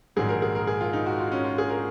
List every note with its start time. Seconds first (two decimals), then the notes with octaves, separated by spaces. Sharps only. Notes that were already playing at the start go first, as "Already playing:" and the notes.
0.16 A#1 G#2 D#3 F#3 G#4
0.29 A#4
0.42 G#4
0.55 A#4
0.67 G#4
0.81 F4
0.93 D#4
1.06 F#4
1.19 F4
1.32 C#4
1.45 F4
1.58 G#4
1.70 A#4